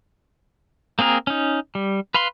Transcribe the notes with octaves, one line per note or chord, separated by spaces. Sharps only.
A#3 C4 G#4 A#4
C#4 D#4
G3
B4 F5 B5 C6